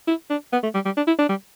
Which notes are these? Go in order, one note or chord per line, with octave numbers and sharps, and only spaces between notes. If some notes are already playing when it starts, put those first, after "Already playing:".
E4
D4
B3
A3
G3
G3
D4
E4
D4
G3